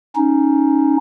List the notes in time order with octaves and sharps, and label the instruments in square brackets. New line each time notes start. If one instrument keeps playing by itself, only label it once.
[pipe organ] C#4 D#4